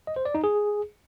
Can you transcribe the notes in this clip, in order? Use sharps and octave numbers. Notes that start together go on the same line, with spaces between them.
D#5
C5
D5
D#4
G#4